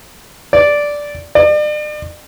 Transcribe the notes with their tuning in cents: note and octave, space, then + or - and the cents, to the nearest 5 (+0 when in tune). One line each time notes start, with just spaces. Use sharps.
D5 -5
D5 +40